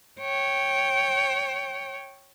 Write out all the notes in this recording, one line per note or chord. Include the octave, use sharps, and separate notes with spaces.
C#5 G5